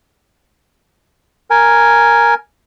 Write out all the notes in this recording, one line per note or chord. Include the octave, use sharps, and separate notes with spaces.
A#4 G#5